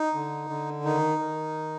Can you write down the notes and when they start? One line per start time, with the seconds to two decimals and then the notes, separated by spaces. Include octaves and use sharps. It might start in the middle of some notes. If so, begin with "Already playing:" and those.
Already playing: D#4
0.14 D3
0.50 D3
0.85 D#3 D#4
1.19 D#3